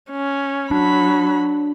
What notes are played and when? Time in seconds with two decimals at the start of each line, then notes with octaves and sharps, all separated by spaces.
0.11 C#4
0.71 F#3 D4 B5